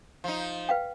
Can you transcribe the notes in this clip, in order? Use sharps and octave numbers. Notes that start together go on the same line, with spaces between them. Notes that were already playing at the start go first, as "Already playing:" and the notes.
F3 D#4
B4 F5 G5